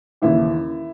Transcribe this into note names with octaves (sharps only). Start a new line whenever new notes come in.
D#2 C#3 E3 E4